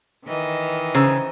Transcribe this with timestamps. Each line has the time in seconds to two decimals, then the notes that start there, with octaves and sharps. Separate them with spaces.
0.25 D#3 E3 D#5
0.95 C#3 C5 A#5 E6